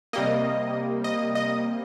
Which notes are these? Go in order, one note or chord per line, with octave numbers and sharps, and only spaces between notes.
C3 G3 A#3 D#5
D#5
D#5